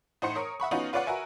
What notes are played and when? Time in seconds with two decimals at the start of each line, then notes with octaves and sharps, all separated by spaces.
0.22 A2 D#4 C5 F#5 C#7
0.35 A#4 C#5 D#6
0.60 E5 F#5 B5 C#6
0.71 B3 C#4 D#4 F4 F#4
0.93 F4 B4 C#5 D5 F5 F#5
1.07 F#4 A#4 B4 E5 G#5